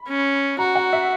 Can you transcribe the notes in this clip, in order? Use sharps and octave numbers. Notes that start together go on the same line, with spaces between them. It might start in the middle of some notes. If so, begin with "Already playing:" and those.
Already playing: B5
C#4
F#4 A#5
F#5
E5